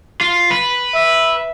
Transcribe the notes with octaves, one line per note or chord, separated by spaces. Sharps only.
F4
B4
E5